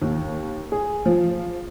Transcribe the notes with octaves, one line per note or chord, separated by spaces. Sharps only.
D#2
G#4
F3